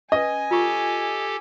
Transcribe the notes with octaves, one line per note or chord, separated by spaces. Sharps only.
C#4 B4 D#5 G#5
F4 G4 A4 C#6